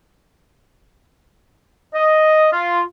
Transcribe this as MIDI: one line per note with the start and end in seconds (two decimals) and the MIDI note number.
1.94 2.48 75
2.52 2.81 65